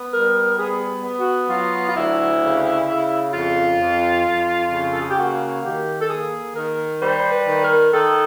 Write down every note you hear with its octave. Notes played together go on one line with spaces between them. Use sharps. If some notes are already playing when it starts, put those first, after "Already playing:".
Already playing: B3
G3 A#4
B3 G#4
B3
F#4
F#3 F4
F4
D2 E4
C#3
C#3
F2 F4
F2
F2
C#3
A4
G#4
G4
A#3 F#4
D#3 G4
A4
A#3 G#4
D#3 A#4
G3 C5
B4
D#3
A#4
D#3 A4